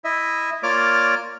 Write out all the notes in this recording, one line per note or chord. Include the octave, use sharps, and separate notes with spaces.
E4 D#5 E5
A#3 F4 C#5 D5 D6 F6